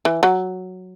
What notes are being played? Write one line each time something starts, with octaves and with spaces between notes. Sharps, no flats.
E3
F#3